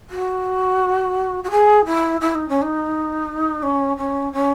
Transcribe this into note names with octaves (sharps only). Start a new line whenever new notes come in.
F#4
F#4
G#4
E4
E4
D#4
C#4
D#4
C#4
C#4
C#4